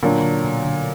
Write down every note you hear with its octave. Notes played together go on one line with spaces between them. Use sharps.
A#2 D3 F#3 D4
D3
B2
D3